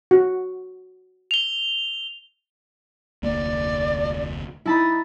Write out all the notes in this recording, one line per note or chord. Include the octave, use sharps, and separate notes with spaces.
F#4
F7 G7
F1 D2 A#3 D5
D#4 E4 A5 B5